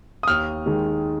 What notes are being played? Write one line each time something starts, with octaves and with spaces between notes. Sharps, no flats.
D#6
D#2 F6
D#3 G#3